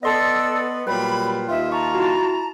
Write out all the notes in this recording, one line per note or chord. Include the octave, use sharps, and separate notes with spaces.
B3 A4 D5 D#5 C6 E6
A#2 F#3 G3 B4 G5 B5
D#2 D#4 F4 E5
A5 A#5 C#6
E4 F#4